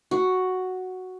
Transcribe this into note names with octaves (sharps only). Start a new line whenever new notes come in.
F#4